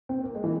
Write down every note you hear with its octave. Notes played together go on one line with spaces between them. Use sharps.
C4
A#3
G#3
E3